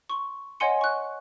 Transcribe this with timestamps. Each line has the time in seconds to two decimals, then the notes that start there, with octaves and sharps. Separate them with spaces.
0.09 C6 C#6
0.60 C#5 D#5 F#5 G#5 C6 C#7
0.81 C#6 F#6